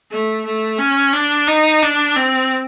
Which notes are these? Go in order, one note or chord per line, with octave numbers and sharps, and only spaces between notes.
A3
A3
C#4
D4
D#4
D4
C4